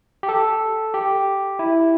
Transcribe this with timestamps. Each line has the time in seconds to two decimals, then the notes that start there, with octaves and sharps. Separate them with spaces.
0.23 G4
0.29 A4
0.94 G4
1.59 E4